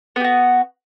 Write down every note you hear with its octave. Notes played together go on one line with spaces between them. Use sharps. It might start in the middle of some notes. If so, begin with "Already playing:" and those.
B3 F#4 G4